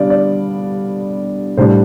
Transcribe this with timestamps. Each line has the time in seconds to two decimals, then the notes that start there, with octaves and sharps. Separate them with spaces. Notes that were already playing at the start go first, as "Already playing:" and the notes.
Already playing: D3 G3 B3 D4 D5 F5
0.10 D5
1.57 A2 G3 D4 C5